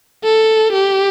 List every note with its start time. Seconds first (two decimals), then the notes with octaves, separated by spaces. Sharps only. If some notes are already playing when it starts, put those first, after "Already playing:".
0.24 A4
0.73 G4